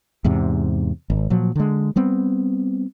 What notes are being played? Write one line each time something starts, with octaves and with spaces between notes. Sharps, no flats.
E2 G#2 C3
G#1
A#2 F3 F#3
D3 G#3
G3 B3 C4